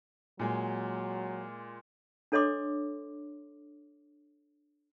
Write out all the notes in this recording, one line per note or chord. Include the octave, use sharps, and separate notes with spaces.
A#2 F#3 G#3
D4 A4 C#5 D#5 C6 D6